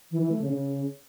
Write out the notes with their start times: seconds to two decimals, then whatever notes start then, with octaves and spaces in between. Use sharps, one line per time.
0.11 E3
0.21 E3
0.31 A3
0.41 C#3
0.51 C#3